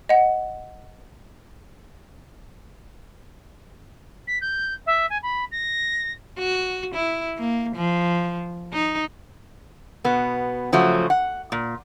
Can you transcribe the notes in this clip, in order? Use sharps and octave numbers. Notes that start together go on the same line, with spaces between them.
D#5 F#5
B6
G6
E5
G#5
B5
A#6
F#4
E4
A#3
F3
D#4
B2 B3
C#3 F3 F#3 A3 F#4
F#5
A#2